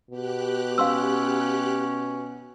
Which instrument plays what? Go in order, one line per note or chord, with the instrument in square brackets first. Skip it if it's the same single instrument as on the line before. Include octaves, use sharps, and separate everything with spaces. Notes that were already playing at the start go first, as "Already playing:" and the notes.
[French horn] B2 [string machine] G4 F#6
[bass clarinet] C#4 [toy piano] F5 C6 E6